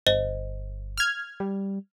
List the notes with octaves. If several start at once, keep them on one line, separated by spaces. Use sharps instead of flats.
G1 C5 D#5 G7
F6 G#6
G3